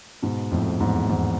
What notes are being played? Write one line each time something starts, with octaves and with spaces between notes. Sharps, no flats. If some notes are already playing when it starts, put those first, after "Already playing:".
G#2 B2
F2 A2
E2 G#2
E2 G#2